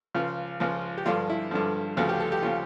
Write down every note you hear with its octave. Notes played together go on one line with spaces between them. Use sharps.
C#2 C#3 F3 F4
C#2 C#3 F3
G4
G2 D3 F3 F4
E4
G2 D3 F3
D2 C#3 F3 A4
G4
A4
G4
C#3 F3 F4